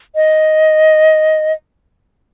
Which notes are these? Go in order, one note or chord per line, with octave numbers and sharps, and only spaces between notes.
D#5